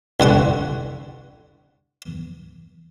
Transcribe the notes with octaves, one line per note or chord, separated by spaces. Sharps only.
C2 D3 F#5 C#6